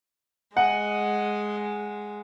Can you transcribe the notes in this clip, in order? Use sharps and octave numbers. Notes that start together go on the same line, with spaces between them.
G#3 D#5 F#5 G#5